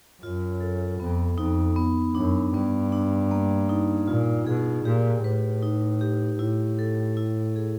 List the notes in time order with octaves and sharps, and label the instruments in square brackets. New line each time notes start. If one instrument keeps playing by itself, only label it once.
[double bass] F#2 [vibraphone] F4
[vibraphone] A4
[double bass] F2 [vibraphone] B3
[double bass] F2 [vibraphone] D#4
[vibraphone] B3
[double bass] F#2 [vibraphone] D4
[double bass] G2 [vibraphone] B3
[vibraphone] D4
A#3
D#4
[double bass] A#2 [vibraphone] F4
[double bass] B2 [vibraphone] G#4
[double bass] A#2 [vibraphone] G4
[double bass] A2 [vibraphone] B4
[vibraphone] D#4
G4
[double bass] A2 [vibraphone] E4
[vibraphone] A4
E4
G#4